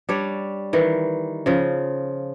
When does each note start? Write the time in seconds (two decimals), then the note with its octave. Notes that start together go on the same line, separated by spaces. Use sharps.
0.09 G3 D4 C#5
0.73 D#3 E3
1.46 C#3 F3